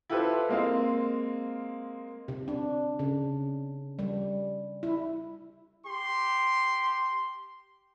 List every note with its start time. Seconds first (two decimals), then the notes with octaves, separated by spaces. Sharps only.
0.10 E4 F4 G4 A4 B4 C5
0.49 G#3 A#3 C4 F5
2.28 C3
2.48 D4
2.99 C#3
3.99 G3
4.83 E4
5.85 G4 C6